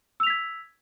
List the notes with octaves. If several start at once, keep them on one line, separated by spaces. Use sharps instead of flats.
E6 G#6 B6 F7